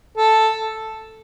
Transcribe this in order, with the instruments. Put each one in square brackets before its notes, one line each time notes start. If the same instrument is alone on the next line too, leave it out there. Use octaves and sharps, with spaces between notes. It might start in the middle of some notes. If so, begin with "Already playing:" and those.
[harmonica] A4